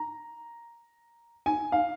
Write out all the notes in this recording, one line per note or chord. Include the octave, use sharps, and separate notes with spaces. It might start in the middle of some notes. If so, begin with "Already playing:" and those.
Already playing: A#5
G#5
F5